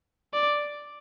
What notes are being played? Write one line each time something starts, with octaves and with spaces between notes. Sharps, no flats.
D5